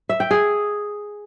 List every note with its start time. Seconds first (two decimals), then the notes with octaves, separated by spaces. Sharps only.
0.09 E5
0.20 G5
0.31 G#4